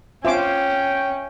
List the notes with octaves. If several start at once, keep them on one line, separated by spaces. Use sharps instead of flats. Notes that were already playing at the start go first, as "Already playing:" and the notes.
C#4 F4 C5 E5 G5 G#5 D6